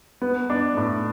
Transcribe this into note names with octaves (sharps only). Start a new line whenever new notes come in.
B3
D4
A2